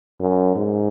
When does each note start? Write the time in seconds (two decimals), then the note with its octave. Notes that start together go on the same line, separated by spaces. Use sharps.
0.20 F#2
0.56 G#2